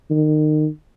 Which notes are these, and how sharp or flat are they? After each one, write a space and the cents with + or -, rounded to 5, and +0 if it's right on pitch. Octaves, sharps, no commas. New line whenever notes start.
D#3 -25